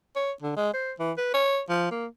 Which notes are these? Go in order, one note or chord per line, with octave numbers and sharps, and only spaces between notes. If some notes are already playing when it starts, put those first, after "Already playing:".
C#5
D3
G#3
C5
E3
B4
C#5
F3
A#3